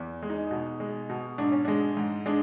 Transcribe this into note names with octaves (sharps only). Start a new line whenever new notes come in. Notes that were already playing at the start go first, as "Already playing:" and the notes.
Already playing: E2
G#3
D#4
B2
G#3
B2
G#2 D4
C#4
G#3 D4
G#2
G#3 D4